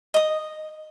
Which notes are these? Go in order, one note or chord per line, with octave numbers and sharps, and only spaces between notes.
D#5 D#6